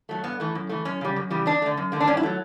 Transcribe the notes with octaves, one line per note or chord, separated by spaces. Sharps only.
F#3 A3
G2 B3
E3 A3
F#2
E3 A3
F#2 C#4
C#3 G3
F#2
C#3 E3 G3
E2 D4
D3 A3
F#2
D3 A3
D4
G2 C#4
E4
F#3 A3